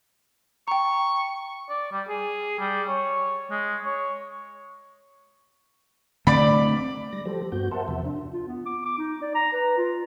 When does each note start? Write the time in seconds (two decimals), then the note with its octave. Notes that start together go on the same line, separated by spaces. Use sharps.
0.68 G5 A#5 C#6
1.69 D5
1.92 G3
2.08 G#4
2.59 G3
2.88 C#5
3.51 G#3
3.85 C#5
6.27 D3 A3 C4 D5 B5
7.13 G3 A#6
7.26 F3 G3 G4 A4 C5
7.52 G2 B3 F#4 G6
7.71 A#4 C5 E5 F#5 A5 C6
7.88 E2 C3 F3 E5
8.05 D4
8.33 F4
8.48 B3
8.66 D6
8.85 D6
8.98 D#4
9.22 D5
9.35 A#5
9.53 B4
9.77 F4